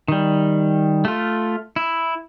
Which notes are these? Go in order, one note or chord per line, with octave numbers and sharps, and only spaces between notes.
D#3 G3
A3 F4
E4